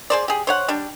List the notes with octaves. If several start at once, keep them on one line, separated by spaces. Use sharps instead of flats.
G#4 C5 D5
G4 G#4
C5 C#5 F#5
G3 D4